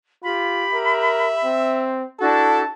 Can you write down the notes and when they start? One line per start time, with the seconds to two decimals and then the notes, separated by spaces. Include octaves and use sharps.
0.24 F4 G4 B5
0.73 A#4 E5
1.44 C4
2.20 D4 E4 F#4 A4 A5